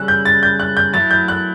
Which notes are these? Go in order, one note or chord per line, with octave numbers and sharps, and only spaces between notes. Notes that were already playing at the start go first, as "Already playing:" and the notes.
Already playing: C#3 G3 C#4 E6 F#6
G6
A6
G6
F#6
G6
F#3 A3 E4 A6
G6
F#6